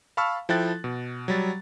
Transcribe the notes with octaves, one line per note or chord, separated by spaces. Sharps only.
F5 A5 B5 C#6 E6 F6
F3 E4 A4 G5 F#6 A6
B2
F#3 G3 A6